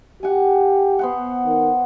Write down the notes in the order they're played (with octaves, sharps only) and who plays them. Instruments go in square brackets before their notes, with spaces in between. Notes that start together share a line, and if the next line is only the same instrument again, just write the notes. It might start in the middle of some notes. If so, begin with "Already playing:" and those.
[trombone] G4 [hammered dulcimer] F#5 G#5
[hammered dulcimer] B3 C5 F#5
[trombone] D#3